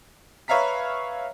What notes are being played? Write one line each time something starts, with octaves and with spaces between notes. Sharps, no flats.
B4 C#5 E5 F5 A#5 B6